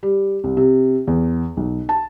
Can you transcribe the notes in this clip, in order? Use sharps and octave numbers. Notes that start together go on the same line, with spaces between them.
G3
C2
C3
E2
B1
A5